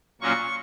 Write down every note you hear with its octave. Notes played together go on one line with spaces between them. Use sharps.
A#2 F#3 A#3 C#4 F4 C#6